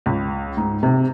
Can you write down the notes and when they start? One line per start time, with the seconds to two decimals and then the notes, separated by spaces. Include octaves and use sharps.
0.06 C#2
0.57 G#2
0.83 C3